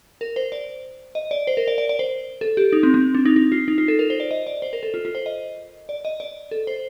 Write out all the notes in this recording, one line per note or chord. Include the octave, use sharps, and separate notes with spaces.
A#4
C5
D5
D#5
D5
C5
A#4
D5
D5
D5
C5
A4
G4
D#4
C4
C4
D4
D#4
D#4
F4
D#4
F4
A4
A#4
C5
D5
D#5
D5
C5
A#4
A4
F4
F4
C5
D#5
D5
D#5
D5
A4
C5